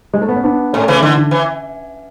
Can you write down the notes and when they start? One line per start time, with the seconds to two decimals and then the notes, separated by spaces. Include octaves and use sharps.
0.14 G#3
0.22 A3
0.29 B3
0.36 C#4
0.44 B3 D4
0.73 A2 A3 C#4
0.88 C#3 E3
1.02 D3 E3
1.17 D3
1.31 E3